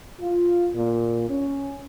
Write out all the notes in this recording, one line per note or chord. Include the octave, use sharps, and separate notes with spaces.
F4
A#2
C#4